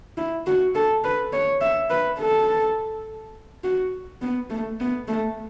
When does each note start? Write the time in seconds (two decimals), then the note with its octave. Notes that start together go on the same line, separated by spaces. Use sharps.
0.17 E4
0.46 F#4
0.75 A4
1.04 B4
1.33 C#5
1.61 E5
1.90 B4
2.19 A4
3.64 F#4
4.22 B3
4.50 A3
4.80 B3
5.08 A3